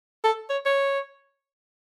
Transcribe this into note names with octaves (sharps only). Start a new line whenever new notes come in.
A4
C#5
C#5